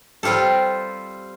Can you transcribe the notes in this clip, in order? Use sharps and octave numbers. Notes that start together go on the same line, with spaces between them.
G3 C4 F4 G4 A4